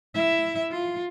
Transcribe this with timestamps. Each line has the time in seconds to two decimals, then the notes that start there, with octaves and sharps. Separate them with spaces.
0.15 E4 E5
0.71 F4